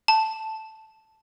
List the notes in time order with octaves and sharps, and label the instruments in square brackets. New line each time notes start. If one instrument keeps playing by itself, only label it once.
[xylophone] A5